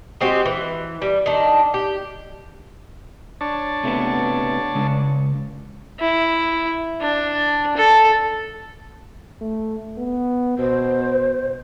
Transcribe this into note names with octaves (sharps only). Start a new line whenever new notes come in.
G#3 C4 F#4 G4
E3
G3
D#3 D4
G4
D4 C#5 A5
C3 A3 B3
C#3 G#3
E4
D4
A4
A3
B3
B2 C5